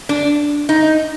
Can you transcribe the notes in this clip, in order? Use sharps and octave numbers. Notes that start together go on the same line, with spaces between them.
D4
D#4